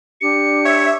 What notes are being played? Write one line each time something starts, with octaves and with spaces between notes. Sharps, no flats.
D4 G4 C#7
C#5 E5